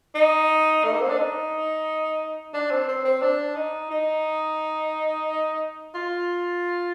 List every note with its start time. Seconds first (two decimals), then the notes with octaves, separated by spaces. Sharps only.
0.15 D#4
0.84 A3
0.93 A#3
1.02 C4
1.10 D4
1.18 D#4
2.54 D4
2.71 C4
2.88 C4
3.05 C4
3.22 D4
3.56 D#4
3.91 D#4
5.95 F4